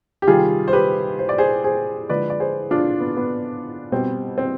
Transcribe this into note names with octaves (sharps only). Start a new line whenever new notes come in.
G4
C3 D#3 G3 F4 G#4
C5
G4 B4
C5
D5
G#4 C5
G#4 C5
D3 F3 G#3 B4 D5
D5
G#4 C5
D4 F4
B3
B3
B2 G3 C4
C4